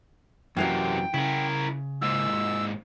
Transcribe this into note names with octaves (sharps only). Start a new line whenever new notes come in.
F#2 C3 E3 F#3 A#3 G5
C#3 E4 A#4
G#2 A#3 E6